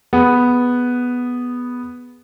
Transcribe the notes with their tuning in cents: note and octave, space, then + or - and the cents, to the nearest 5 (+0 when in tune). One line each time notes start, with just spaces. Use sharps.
B3 +0 G#4 +0